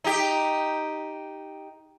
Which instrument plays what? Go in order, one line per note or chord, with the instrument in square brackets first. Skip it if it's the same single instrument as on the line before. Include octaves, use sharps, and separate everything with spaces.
[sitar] D#4 G4